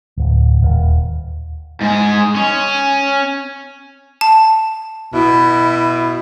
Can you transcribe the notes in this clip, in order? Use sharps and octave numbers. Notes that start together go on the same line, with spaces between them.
D1
D#1
G#2 G#4
C#4
A5
B2 E4